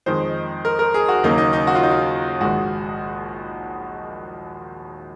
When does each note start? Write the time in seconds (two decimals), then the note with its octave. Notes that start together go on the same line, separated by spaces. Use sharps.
0.06 F2 D#3 G#3 C5
0.65 A#4
0.79 A#4
0.94 G#4
1.08 F#4
1.23 D#2 C#3 F#3 A#3 D#4
1.38 D#4
1.53 D#4
1.67 F#4
1.75 F4
1.83 D#4
1.92 F4
2.41 A#1 G#2 D#3 G#3 F#4